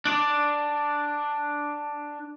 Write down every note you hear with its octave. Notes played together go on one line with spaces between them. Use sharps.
D4 D5